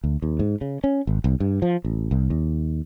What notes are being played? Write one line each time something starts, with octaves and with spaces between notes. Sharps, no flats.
D2
D#2
G#2
C#3
C#4
G#1
C2
G2
F3
A1
C2
D#2